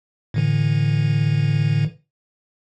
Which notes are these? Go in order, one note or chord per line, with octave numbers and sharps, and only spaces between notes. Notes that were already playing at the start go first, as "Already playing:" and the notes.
A2 D3 E3